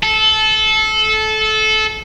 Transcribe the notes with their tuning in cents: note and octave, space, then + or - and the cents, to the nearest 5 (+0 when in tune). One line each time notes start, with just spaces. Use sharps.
A4 -20